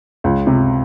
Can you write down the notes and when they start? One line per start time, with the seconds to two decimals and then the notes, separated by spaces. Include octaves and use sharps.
0.24 C#2
0.47 C3